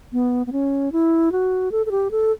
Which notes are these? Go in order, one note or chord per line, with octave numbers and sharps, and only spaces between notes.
B3
B3
C#4
E4
F#4
A4
A4
G4
A4